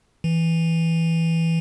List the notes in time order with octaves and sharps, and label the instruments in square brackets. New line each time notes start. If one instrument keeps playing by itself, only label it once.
[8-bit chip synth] E3